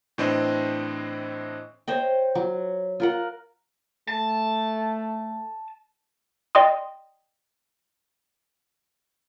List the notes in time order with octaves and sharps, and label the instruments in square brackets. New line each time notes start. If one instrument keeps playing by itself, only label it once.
[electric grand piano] A2 E3 C4 D4 C5 D#5
[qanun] C5 C#5 D#5 G5
F#3
F4 A#4 F#5
[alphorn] A3 [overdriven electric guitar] A5
[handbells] D5 D#5 G5 C6 D#6